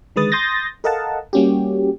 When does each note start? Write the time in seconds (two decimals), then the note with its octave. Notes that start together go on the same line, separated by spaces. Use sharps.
0.16 D3 D#3 G#3 B4 D#6 A6
0.32 C6 D#6 G6 A6 A#6
0.84 A4 A#4 D#5 F5 F#5 A5
1.33 G3 A#3 C#4 F#4 G4